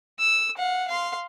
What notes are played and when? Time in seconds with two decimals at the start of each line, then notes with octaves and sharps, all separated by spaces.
0.20 E6
0.57 F5 F#5
0.88 F5 C6